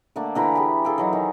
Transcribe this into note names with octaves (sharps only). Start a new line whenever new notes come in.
D3 A3 A#3 D4
D3 E3 A#5 B5
E4 G4 G#4
G#4 A4 F5 G5
E3 F#3 D#4
D#3